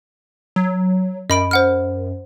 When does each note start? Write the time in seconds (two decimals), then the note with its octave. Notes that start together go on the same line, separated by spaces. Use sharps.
0.56 F#3
1.30 F#2 D#5 B5 D7
1.51 C5 F#5 F6